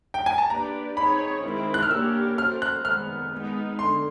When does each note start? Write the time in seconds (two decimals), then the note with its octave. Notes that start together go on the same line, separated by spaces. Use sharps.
0.14 G5
0.26 G#5
0.38 A5
0.50 A#3 D4 G4 B4 D5 A#5
0.97 C4 D#4 G#4 C#5 B5
1.44 D#3 G#3 C4 E4
1.74 F#6
1.83 F6
1.91 A#3 D4 G4 A#4 C#5 E6
2.38 C#4 F#4 A4 C5 F6
2.62 F#6
2.85 D#3 G#3 B3 F6
3.32 G#3 B3 D#4
3.79 D3 C6